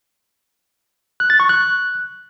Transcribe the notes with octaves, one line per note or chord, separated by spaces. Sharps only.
F#6
A6
C#6
F#6